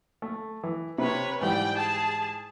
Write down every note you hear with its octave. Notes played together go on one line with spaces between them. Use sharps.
A3
E3
C3 B4 C#5
G#2 E3 G3 D5 G5
G#4 A5